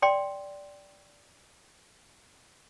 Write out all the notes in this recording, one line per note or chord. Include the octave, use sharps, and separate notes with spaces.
D5 G5 C6